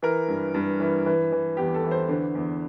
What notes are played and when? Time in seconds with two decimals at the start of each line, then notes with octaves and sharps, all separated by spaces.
0.02 E3 A#4
0.28 G2
0.54 G2
0.80 E3
1.06 E3
1.32 E3
1.57 E2 G4
1.74 A4
1.84 E3
1.91 C5
2.08 D3 C5
2.35 E2